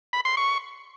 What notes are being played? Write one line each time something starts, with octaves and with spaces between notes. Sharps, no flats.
B5
C6
C#6